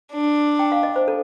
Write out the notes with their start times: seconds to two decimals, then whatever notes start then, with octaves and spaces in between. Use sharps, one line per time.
0.12 D4
0.59 G5
0.72 F5
0.83 D#5
0.96 C5
1.08 A4